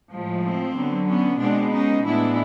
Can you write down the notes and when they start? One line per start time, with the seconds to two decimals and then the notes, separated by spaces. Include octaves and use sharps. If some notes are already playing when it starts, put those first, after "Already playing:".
0.11 A2 F3 G#3
0.43 C4
0.75 D3 F#3 B3
1.08 B3 C#4
1.40 B2 G#3 B3 C4 D4
1.72 C#4 D#4
2.05 A2 E3 G#3 B3 D4 E4